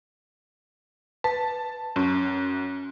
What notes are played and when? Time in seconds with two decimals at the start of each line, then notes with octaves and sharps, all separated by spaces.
1.24 B4 A5
1.96 F#2 C#4